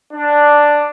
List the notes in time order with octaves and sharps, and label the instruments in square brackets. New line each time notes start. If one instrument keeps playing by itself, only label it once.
[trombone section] D4